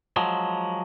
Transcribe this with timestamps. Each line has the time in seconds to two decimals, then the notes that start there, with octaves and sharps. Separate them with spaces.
0.16 F3 F#3 G#3